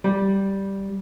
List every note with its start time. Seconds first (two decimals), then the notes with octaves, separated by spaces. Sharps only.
0.04 G3